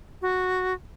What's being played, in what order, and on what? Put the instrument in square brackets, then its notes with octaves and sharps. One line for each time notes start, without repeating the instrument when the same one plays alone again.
[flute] F#4